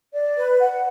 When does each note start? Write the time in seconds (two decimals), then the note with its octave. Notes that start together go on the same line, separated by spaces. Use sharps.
0.13 D5
0.36 B4
0.60 F#5